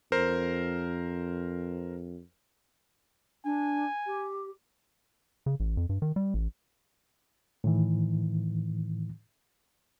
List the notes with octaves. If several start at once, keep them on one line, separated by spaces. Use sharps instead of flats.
F2 A#4 C5
D4 G#5
G4
C#3
A1
F2
G2
D#3
G3
A1
A2 D#3 E3